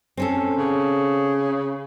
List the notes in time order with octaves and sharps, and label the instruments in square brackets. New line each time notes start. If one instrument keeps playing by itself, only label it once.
[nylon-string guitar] C4 C#4 A4
[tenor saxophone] C#3